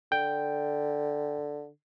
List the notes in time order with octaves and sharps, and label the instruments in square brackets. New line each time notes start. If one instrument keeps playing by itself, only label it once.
[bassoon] D3 [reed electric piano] G5